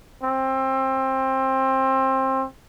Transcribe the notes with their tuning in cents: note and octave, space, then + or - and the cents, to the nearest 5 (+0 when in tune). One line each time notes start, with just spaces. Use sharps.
C4 +25